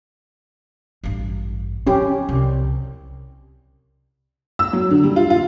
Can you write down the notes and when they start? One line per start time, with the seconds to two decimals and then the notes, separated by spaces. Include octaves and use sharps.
1.04 A1 G2
1.87 F3 C#4 G4
2.29 C2
4.59 E6
4.73 F#3
4.91 D3
5.04 G3
5.16 F4
5.30 F4